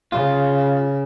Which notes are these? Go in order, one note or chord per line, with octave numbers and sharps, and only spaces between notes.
C#3 F4